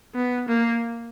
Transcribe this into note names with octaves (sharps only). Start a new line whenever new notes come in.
B3
A#3